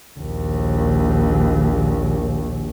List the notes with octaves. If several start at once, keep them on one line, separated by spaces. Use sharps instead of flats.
A#1 D#2